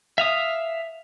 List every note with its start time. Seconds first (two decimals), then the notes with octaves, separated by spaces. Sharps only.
0.18 E5 F5 D#6